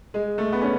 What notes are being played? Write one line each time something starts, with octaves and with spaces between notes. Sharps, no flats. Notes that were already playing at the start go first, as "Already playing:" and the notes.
G#3
A3
B3
C#4